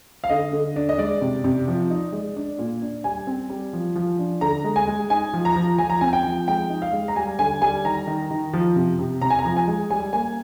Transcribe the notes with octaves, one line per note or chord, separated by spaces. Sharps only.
F5
D3 D#5
D3
D4
D#5
G#3 D5
C3
C3
F3
D#4
G#3
D4
A#2
D4
G3 G#5
C4
G3
F3
F3
D4
D3 A#5
G#3
G#5
G#3
D#4 G#5
F3
A#5
F3
F3 G#5
A#5
C4 G#5
G5
F3
G#3 G5
D#4
F5
G#3
A#5
G3 G#5
D3 G#5
G3 G#5
D#3 A#5
D#3
D#3
F3
C3
C3
C3 A#5
G#5
A#5
F3
G#5
G#3
G3 G#5
A#3 G#5